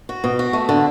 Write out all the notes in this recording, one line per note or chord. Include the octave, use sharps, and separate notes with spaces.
F#4
B2
F#4
A3
D3